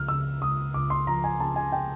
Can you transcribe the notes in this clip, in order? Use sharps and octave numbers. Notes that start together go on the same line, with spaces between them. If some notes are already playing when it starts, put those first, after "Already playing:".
Already playing: C#2 F3 F6
C#3 E6
C#2 D#6
C#2 D6
C6
F3 A#5
G#5
C#3 A5
G#5
G5